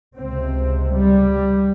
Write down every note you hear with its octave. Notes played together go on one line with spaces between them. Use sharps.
C#2 C3 C4
G3